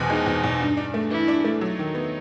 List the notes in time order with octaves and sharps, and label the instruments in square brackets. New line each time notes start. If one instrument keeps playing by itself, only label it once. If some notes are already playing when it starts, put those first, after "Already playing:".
Already playing: [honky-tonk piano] E2 B2 C4
[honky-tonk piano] G#3 [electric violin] D#4
[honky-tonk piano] E2
E2
G2
D4
A3
[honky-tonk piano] E3 [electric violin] E4
[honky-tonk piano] D4
A3
[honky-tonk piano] F#3 [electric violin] D#4
[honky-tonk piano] D#3
B3